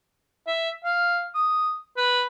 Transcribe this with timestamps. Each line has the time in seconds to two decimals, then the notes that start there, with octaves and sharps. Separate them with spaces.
0.47 E5
0.84 F5
1.35 D#6
1.97 B4